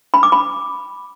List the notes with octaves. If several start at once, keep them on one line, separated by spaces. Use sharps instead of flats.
B5
D6
B5